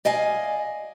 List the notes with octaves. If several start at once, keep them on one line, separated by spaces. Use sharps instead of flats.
D5 D#5 F5 G#5